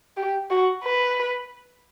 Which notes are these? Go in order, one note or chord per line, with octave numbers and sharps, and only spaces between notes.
G4
F#4
B4